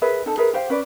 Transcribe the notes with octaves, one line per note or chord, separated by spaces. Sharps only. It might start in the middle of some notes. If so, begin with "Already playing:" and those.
G#4 A#4 B4 E5
D#4 A4
G#4 A#4 B4 E5
G4 C5 F5
C#4 B4 D5